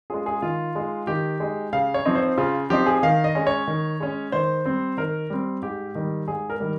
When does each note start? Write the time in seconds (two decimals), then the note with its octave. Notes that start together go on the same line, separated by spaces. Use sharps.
0.10 G#3 C#4 F4 G#4
0.26 G#4
0.42 D#3 F4
0.75 G#3 D#4
1.07 D#3 G4
1.40 G#3 D#4
1.73 C#3 F5
1.94 C#5
2.05 F3 C4 D#4
2.15 C5
2.38 C#3 F4
2.70 F3 C4 D#4 G4
2.86 G#4
3.03 D#3 F5
3.24 D#5
3.35 G#3 C#4
3.47 C#5
3.68 D#3
4.00 G#3 C#4
4.32 D#3 C5
4.65 G3 C4
4.97 D#3 A#4
5.30 G3 C4
5.63 G#2 G4
5.95 D#3 G3
6.28 G#2 G#4
6.50 A#4
6.60 D#3 G3